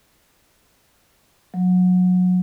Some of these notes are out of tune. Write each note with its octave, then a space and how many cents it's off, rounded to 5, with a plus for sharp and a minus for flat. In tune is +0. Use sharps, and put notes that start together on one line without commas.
F#3 -30